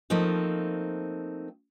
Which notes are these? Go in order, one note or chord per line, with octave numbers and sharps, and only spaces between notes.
F3 A3 A#3 C4 D#4